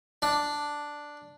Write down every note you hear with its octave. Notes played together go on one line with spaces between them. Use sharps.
D4